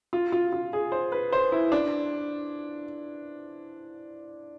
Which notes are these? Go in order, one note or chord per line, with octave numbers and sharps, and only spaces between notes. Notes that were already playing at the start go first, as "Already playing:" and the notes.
F4
F4
F4
G#4
C5
B4
C5
E4
D4